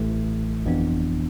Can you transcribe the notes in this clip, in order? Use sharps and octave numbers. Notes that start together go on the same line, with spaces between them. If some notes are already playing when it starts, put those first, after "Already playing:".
Already playing: A1 A2 E3 A3
G1 F2 E3 B3 D4